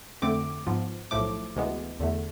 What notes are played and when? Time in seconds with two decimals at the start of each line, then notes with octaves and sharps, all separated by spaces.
0.22 F2 D3 A3 C4 D6
0.67 G#2 F3 B3 F4
1.11 B1 A2 F3 A3 D6
1.55 D2 C3 E3 G#3 B3
1.99 E2 D3 A3